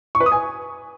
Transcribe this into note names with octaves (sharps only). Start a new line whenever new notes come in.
C#6
B4
D#6
G#5